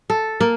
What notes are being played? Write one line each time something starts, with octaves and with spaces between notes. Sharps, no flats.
A4
A#3